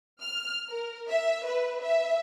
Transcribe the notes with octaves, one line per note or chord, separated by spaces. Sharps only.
F6
A#4
E5
B4
E5